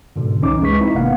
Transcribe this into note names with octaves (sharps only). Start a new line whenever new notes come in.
G#2 B2 D3
C2 E3 C#4 D#4 D6
C#2 G#3 B4 C#6 B6
C4 D#4 E4
G#1 C3 A#3 B3 F5 F#5